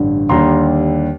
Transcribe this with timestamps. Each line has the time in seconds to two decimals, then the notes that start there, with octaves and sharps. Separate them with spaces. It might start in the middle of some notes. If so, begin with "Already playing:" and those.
Already playing: A1 G2 D3
0.29 D#2 D3 G3 A#5 C6